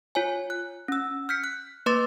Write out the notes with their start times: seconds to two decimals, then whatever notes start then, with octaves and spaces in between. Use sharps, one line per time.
0.15 F4 C#5 G#5
0.50 F#6
0.88 C#4 E6
1.29 F6 G6 B6 C#7
1.44 F#6
1.86 A#3 B4 C6 D6 A6